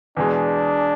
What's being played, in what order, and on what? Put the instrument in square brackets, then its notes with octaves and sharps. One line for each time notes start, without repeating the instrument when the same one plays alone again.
[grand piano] E2 B2 G#3 [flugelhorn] D4